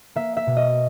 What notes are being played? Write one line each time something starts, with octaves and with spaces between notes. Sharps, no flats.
A#3 E5
E5
B2
D#5